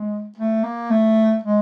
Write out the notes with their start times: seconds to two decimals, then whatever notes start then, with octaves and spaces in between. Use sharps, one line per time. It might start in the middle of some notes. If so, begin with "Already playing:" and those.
Already playing: G#3
0.38 A3
0.64 A#3
0.91 A3
1.43 G#3